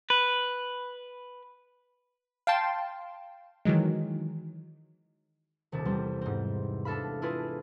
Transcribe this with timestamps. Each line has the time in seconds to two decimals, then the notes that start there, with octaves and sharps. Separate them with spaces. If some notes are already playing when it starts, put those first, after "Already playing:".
0.10 B4
2.47 F5 G5 A5 C6
3.65 D#3 E3 F#3 G#3
5.72 D#1 C3 A4
5.85 E2 G3 C4
6.21 G#2 C4
6.85 D4 A4 E5 F5 B5
7.22 E4 F4 G#4 A4 B4